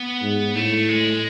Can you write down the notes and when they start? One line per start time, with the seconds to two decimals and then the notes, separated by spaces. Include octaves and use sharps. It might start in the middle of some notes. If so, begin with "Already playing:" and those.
Already playing: B3
0.22 G#2
0.55 A2 A3
0.89 G#3